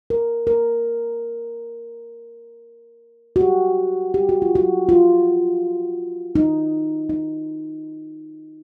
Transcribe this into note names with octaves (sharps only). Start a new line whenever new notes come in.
A#4
A#4
F#4
G4
G4
F#4
F4
F#4
F4
D#4
D#4